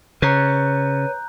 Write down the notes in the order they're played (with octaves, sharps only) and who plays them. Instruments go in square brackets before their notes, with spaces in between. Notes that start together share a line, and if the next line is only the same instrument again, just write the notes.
[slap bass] C#3 [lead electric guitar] B4 C#5 [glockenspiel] A#5 F#6 G6